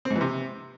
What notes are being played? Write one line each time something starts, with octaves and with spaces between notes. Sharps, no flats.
C4
G#2
E3
C3